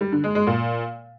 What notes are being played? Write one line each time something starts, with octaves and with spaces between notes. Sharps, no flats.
G3
D3
G#3
G#3
A#2